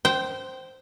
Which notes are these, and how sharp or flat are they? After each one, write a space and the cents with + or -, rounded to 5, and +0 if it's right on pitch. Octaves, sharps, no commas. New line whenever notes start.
C5 +0 G5 -20